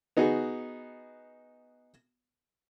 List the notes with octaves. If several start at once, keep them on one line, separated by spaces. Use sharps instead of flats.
B3 D#4 F#4 G#4